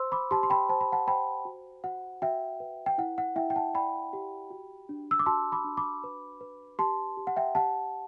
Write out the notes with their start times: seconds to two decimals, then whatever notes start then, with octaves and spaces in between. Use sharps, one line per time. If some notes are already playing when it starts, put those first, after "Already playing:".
Already playing: C5 C6 E6
0.12 B5 D6
0.31 G4 A5 C6
0.43 C6
0.50 G5 B5
0.69 C5 A5
0.81 B5
0.92 F#5 A5
1.07 C5 G5 B5
1.45 F#4
1.84 F#4 F#5
2.22 F#4 E5 G5
2.60 B4
2.86 G5
2.98 E4 F#5
3.18 F#5
3.36 E4 E5 G5
3.50 G5
3.56 F#5 A5
3.74 D5 G5 B5
4.13 G4
4.50 F#4
4.89 D4
5.11 E6
5.19 D6
5.26 F#4 A5 C6
5.52 B5 D6
5.65 D4
5.77 B5 D6
6.04 B4
6.41 B4
6.79 G4 A5 C6
7.17 G4
7.27 F#5
7.36 E5 G5
7.55 G4 F#5 A5